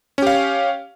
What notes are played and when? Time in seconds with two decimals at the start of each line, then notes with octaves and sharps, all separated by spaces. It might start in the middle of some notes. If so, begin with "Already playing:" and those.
0.18 C#4
0.22 G4
0.27 F5